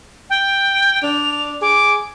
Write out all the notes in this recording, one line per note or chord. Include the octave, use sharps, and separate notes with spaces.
G5
D4 F7
G#4 D6